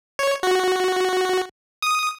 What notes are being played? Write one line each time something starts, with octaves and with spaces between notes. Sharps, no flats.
C#5
F#4
D#6